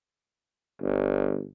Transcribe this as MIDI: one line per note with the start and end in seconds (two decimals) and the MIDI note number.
0.82 1.45 31